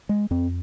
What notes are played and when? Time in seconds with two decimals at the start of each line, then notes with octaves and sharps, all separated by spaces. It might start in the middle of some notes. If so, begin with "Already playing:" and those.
0.09 G#3
0.31 F2 C4